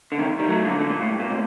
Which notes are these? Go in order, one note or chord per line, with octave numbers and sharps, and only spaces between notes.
D3
C3 D#3
D#3 G3
F#3 A3
A#2 D3
A#2 D3
A#2
A2
G2
A#2
A2 C3